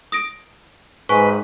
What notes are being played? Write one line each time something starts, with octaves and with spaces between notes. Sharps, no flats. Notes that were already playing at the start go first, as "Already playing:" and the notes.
D#6 A#6 D7
G#2 B4 G#5 C#6